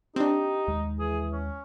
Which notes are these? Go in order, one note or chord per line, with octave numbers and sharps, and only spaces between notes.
C4 D4 D#4 G4
D#2 G#3
E3 G#4
C#4